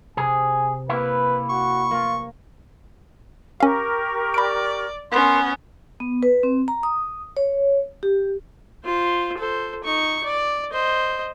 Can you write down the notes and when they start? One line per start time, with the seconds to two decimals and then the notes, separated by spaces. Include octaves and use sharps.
0.17 C3 G#4 G#5
0.89 A#3 E4 B4
1.50 F#4 C#6
1.91 A#3 F4
3.60 C#4 G4 A#4 F5 C#6
4.34 D5 B5 D7
5.11 B3 C#4 A#4 C6
6.00 B3
6.23 B4
6.43 C4
6.68 A#5
6.83 D#6
7.37 C#5
8.03 G4
8.85 F4 C5
9.38 A4 C5
9.84 D#4 C#6
10.24 D5
10.71 C5 D#5